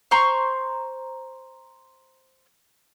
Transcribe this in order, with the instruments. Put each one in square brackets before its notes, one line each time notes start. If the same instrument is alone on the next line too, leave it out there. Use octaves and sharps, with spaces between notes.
[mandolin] C5 A#5 C6 C#6